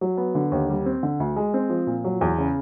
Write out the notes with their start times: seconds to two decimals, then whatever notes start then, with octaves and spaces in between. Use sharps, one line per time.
0.01 F#3
0.17 B3
0.35 D3
0.52 D#2
0.69 G3
0.86 C4
1.03 D3
1.20 D2
1.36 G#3
1.54 C4
1.70 F3
1.87 A#2
2.04 F#3
2.21 E2
2.38 C#3